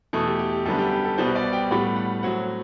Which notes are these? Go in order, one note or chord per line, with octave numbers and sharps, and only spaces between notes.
E2 B2 A3 A4
G4
G4
G4
F#2 D3 G3 B3 A4
G4
G4
A4
C2 B2 G3 B3 C5
D5
G5
A2 G3 B3 F#5
F#5
A2 F#3 C4 F#5